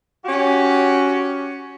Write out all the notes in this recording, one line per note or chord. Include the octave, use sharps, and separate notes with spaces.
C#4 F#4 G4